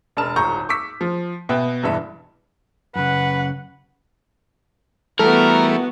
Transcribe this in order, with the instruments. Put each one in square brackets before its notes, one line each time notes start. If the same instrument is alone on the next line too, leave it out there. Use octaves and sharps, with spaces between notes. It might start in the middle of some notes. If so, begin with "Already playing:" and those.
[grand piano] E1 D4 A#4 A5 E7
D#1 G#1 A#5 C#6 G6
C#6 D6 E6 B6
F3
B2 B3 E5 G5 F#6
E1 G2 E3 E5
[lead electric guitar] F#2 C#3 [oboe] B4 [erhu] F#5
[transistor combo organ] E3 G3 A3 [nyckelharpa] B3 F#4 [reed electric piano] A4 [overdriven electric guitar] A#4